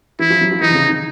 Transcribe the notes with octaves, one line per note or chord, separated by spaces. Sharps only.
E3 E4
F3
F#3
F3
E3 D#4
C3
C#3
D#3